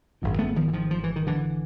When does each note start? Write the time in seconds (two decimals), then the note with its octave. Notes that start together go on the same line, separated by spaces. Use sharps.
0.22 G#1 F#2 D3
0.39 A3 B3
0.56 D#3 F3
0.68 E3
0.73 D#3 F3
0.91 F3
1.04 E3
1.16 D#3
1.27 D3 E3